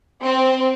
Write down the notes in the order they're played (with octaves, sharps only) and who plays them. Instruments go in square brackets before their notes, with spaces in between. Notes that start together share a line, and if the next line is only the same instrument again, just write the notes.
[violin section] C4